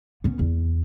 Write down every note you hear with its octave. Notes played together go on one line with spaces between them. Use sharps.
B3 C#4
E2